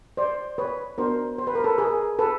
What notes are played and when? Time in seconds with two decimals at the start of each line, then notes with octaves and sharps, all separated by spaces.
0.17 C5 D5
0.58 B4 C#5
0.98 B3 D4 F#4 A#4 C5
1.38 C5
1.47 B4
1.55 A#4
1.64 A4 B4
1.78 G#4 A#4
2.19 A4 B4